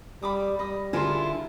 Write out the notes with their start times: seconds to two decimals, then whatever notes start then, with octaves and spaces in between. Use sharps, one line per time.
0.23 G3 B5 D6 D#6
0.59 G3 D#5 B5 D#6
0.93 D3 E4 F4 G#4 A#4 C6